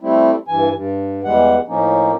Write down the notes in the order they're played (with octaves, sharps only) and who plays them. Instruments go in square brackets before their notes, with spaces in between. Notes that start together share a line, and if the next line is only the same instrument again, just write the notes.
[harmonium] G3 A3 C4 E4
G2 E3 G#5
G2
E2 E3 G3 G#3 F#5
A2 F3 A#3 C#4 D#4